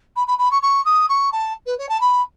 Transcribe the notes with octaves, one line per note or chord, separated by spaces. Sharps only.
B5
B5
B5
C#6
C#6
D#6
C#6
A5
B4
C#5
A5
B5